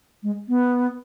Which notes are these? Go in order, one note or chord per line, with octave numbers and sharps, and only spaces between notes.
G#3
B3